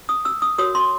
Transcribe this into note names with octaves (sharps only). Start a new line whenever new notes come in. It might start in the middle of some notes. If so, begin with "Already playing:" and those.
D#6
E6
D#6
F#4 A#4 C#5 D#6
C6